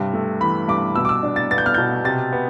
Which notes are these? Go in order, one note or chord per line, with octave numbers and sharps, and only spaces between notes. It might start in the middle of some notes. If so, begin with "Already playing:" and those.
Already playing: G2 C3
A3
E3 B5
G2 D6
B2 E6
D6
E6
D4
A6
B3 A6
G6
F6
B2 G6
C3 A6
B3